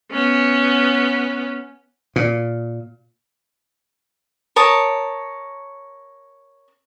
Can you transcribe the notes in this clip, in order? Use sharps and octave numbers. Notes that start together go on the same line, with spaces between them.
B3 C#4
A#2
A#4 C#5 A5 D#6